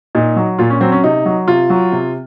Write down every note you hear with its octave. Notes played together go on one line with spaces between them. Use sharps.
A#2 D#4
F#3
A#2 F4
C#4
F#3 C4
C#4
C3 D#4
F#3
C3 F4
F#3
C3